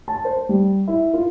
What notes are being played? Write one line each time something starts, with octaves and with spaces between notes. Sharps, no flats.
A5
C5
G3
E4
F4